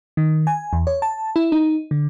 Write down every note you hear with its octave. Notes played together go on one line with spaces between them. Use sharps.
D#3
G#5
E2
C#5
A5
E4
D#4
D3